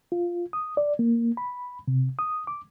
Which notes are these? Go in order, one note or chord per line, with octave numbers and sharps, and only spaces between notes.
F4
D#6
D5
A#3
B5
C3
D#6
D6